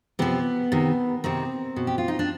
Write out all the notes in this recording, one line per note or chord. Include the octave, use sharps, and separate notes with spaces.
C3 F3 B3
C3 D#3
C3 D#3 C4
B2
G4
F4
D#4
D4